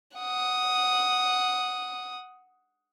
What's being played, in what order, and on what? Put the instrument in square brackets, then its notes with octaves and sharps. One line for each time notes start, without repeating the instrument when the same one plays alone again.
[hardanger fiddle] F#5 D#6